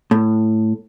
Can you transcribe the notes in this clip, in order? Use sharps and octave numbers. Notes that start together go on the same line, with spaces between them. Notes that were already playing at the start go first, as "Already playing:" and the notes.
A2